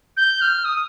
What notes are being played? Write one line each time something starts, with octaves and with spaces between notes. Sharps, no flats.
G6
F6
D#6